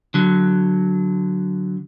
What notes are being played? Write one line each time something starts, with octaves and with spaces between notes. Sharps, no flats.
D3 F#3